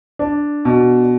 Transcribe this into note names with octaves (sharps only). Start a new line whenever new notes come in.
D4
B2